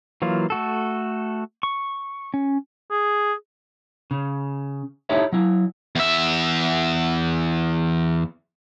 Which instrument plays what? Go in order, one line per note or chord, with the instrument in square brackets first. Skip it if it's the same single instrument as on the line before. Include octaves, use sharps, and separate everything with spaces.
[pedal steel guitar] E3 F#3 A#3 F4
A3 F#4 A4
C#6
C#4
[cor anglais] G#4
[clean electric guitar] C#3
D#4 E4 G4 A4 C#5 E5
F#3 E4
[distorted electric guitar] E2 E5